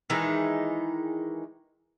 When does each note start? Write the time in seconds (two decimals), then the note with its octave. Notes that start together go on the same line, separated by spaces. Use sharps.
0.10 D#3 E3 G#3 D#4